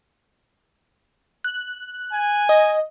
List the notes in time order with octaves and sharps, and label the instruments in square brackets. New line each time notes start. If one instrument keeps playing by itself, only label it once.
[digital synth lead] F#6
[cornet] G#5
[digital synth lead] D#5